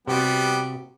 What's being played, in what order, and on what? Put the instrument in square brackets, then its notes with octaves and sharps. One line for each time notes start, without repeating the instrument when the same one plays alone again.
[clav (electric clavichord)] C3 F#4 [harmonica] G3 B3 G5